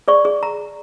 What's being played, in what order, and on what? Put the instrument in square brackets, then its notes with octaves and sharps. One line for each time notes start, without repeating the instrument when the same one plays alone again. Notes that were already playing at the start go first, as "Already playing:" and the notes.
[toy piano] G#4 D5 C#6
G#4
A#5